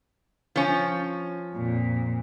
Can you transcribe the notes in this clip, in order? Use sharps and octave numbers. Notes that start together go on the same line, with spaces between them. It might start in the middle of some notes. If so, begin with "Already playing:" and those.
F3 C#4
F2 A#2